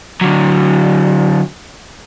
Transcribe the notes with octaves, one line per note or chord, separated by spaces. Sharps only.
D3 F#3